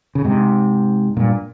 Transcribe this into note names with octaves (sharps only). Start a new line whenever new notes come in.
C#3
G#2 C3
G2 A#2